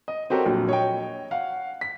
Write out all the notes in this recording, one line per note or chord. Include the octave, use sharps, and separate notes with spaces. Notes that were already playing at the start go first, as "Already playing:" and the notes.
D#5
C4 F#4 G4 A4 A#4 C#5
A#1 F#3
C#5 D#5 G5
F5 F#5
B6